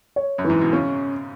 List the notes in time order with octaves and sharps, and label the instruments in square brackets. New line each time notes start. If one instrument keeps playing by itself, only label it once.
[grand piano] C#5
[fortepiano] F#2
[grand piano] E3
[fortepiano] G#2
B2
[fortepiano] C#3 [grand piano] C#4